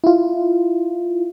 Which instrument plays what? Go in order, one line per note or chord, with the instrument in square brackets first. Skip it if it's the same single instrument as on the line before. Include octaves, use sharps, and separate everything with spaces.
[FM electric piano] E4 F4